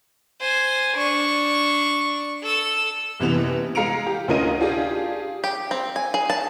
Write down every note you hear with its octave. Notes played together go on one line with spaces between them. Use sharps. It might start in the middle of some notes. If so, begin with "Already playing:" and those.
C5 G#5
D4 C#6
A4 E6
F#1 C3 E3 B3 F7
G#3 F5 A#5 C#7 D7 F7
G4
D2 C#4 F4 A#4 D#5 D#7
D4 F4 G4 G#4
G4
C4
G#5
G#4
A5